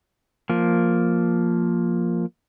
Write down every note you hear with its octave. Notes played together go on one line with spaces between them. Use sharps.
F3 A#3